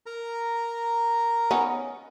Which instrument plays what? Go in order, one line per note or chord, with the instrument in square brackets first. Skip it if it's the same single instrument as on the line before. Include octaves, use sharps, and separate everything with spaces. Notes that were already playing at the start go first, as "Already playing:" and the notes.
[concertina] A#4 A#5
[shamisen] B3 C#4 D#4